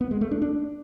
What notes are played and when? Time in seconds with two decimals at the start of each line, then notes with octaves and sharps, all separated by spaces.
0.01 B3
0.11 G#3
0.21 A3
0.31 D4
0.42 D4